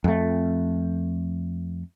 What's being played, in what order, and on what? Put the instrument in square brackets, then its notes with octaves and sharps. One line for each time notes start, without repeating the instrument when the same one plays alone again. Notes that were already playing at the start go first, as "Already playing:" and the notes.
[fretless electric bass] F2 A3